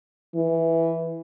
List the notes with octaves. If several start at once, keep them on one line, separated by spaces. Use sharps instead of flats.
E3